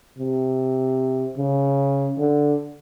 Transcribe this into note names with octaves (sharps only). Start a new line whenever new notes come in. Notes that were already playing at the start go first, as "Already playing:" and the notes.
C3
C#3
D3